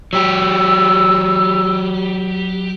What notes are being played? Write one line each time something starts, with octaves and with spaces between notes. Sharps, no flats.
F#3 G4 E6